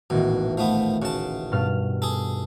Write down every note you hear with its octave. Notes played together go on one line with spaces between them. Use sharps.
D#1 A1 B2
F3 A3 B3
C#3 F#4 A5
G2 B2 F6
G#4 A4